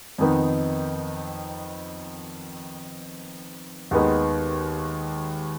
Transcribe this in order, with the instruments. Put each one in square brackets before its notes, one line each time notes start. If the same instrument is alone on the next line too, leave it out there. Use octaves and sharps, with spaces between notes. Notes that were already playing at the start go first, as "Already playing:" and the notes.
[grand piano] F2 D#3 B3 D#4
D#2 D#3 G#3 B3 D#4